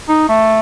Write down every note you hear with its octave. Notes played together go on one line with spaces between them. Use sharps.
D#4
A3